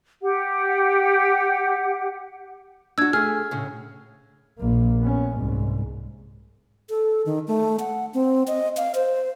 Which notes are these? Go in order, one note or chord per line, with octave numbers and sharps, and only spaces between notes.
G4 F#5
D4 F#4 E6 G#6
A3 G#4 F6
A2 C#3
A#1 A#3
B3 C#4
C2 G#2
A4
D#3
A3
F#5
C4
D#5
F5
C5